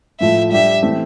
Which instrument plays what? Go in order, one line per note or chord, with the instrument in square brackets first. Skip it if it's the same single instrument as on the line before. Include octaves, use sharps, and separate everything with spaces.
[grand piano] A2 F3 A3 [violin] E5
[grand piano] G3 D4 G4 [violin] E5
[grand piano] E3 A3 C4